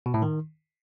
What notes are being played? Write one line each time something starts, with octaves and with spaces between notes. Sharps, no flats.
B2
A2
D#3